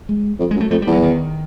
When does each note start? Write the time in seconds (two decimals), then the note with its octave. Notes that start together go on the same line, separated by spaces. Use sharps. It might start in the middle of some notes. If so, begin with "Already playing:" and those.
0.09 G#3
0.39 F2
0.51 G#3
0.56 F#2
0.60 A3
0.71 F2 A3
0.82 G3
0.87 E2
0.92 F#3
1.03 D#3